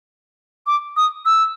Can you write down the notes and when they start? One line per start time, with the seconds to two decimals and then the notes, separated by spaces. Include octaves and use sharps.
0.67 D6
0.97 D#6
1.26 E6